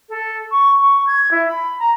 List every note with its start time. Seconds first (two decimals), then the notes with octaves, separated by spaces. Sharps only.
0.09 A4
0.51 C#6
0.81 C#6
1.07 G#6
1.31 E4
1.48 B5
1.79 A#5